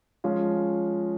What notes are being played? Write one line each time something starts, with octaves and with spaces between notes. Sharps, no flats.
F3 G#3 C#4 F4